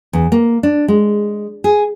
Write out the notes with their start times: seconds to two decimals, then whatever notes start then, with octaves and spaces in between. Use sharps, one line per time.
0.13 E2
0.32 A#3
0.63 D4
0.88 G#3
1.64 G#4